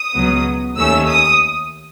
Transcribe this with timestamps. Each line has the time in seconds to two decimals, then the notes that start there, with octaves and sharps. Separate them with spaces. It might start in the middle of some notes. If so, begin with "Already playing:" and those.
Already playing: D#6
0.14 C#2 B2 F#3 B3
0.77 D#2 D#3 A3 C#4 E6
1.08 D#6